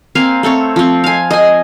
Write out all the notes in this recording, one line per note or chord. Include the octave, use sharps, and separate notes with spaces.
A#3 C4 F5 G#5
A3 C4 A4 C#5
F3 C4
F5 G#5
D#5 G#5